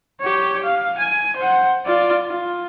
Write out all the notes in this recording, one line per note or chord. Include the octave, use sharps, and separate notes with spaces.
G4 C#5
F5
G#5
C5 F#5
F4 D5
F4